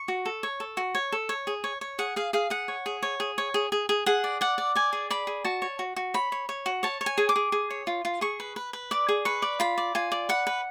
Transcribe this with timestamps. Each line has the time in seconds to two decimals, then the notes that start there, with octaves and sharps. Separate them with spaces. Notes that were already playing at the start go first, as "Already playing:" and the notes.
Already playing: C#6
0.08 F#4
0.26 A4
0.43 C#5
0.60 A4
0.77 F#4
0.95 C#5
1.12 A4
1.29 C#5
1.47 G#4
1.64 C#5
1.81 C#5
1.99 G#4 F#5
2.16 G#4 F5
2.33 G#4 F5
2.50 G#4 F#5
2.68 C#5
2.86 G#4
3.03 C#5
3.20 G#4
3.38 C#5
3.54 G#4
3.72 G#4
3.89 G#4
4.06 G#4 F#5
4.24 D5
4.41 D5 F#5
4.58 D5
4.75 D5 G#5
4.93 G#4
5.10 D5 B5
5.27 G#4
5.45 F#4 A5
5.62 C#5
5.79 F#4
5.96 F#4
6.14 C#5 B5
6.32 C#5
6.49 C#5
6.66 F#4
6.83 C#5 A5
7.01 C#5
7.06 G#5
7.18 G#4
7.29 D6
7.36 G#4
7.52 G#4
7.70 C#5
7.87 F4
8.05 F4
8.21 G#4 C#6
8.40 B4
8.56 B4
8.73 B4
8.91 D5 D6
9.09 G#4
9.25 B4 C#6
9.42 D5
9.60 F4 B5
9.78 D5
9.95 F4 G#5
10.12 D5
10.29 B4 F#5
10.47 B4